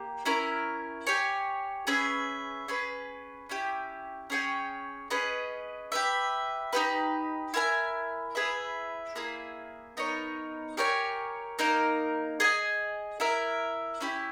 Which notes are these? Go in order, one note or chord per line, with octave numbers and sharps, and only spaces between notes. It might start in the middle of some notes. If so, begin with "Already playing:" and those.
Already playing: A#3 G4
C#4 E4 A#4
G4 C#5 G#5
C#4 G#4 B4 E5
C#4 G#4 B4
C#4 E4 G4
C#4 G#4 C#5 G5
C#4 G#4 B4 D#5
G4 B4 E5
D#4 G4 B4
E4 A#4 E5 G#5
E4 G#4 B4 E5
A#3 E4 G#4
B3 D#4 A#4 C#5
G4 A#4 C#5 G#5
A#3 D#4 A#4
G#4 D#5 G#5
E4 A#4 E5
C#4 E4 G4